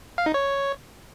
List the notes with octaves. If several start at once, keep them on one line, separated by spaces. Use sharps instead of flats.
F5
D#4
C#5